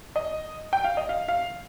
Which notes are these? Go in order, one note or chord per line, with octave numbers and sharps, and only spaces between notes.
D#5
G5
F5
D#5
F5
F5